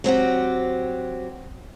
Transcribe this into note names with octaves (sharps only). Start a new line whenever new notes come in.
F#3 C4 F#4 G4